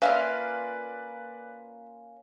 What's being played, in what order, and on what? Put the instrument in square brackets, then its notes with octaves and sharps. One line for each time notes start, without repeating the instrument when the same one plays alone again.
[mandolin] A#3 C#4 F4 [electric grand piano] B4 D5 [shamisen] E5 F5 G#5